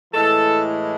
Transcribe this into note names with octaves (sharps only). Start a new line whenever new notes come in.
A2 E3 G#3 A4